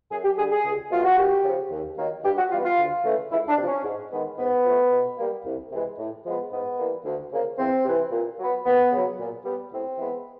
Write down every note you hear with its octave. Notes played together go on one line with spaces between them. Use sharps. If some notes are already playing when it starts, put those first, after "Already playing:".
F#2 G#4
G4
D3 G3 G#4
G#4
C#2
B2 F#3 A3 F4
F#4
D#2 G4
C#3 F3
D#2
D#3 F#3 A#3
G2 G4
F#4
E3 G3 B3 F4
F4
D2
C#3 E3 A3
C#2 E4
D4
C3 F3
C#4
G#2
D#3 G#3 B3
G#2 B3
F3 A3
B2
G3 A#3
C2
C3 E3 G#3
A2
F3 G#3 B3
G#2 B3
E3 G3 A#3
D2
C#3 F3 A#3
E2 C4
C3 E3
A#2
F#3 B3
D#2 B3
C#3 F#3
A#2
G3 B3
A2 C4
E3 G#3 B3